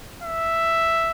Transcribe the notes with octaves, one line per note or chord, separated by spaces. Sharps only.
E5